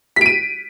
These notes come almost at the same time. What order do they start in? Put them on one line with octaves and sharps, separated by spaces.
B6 D7 D#7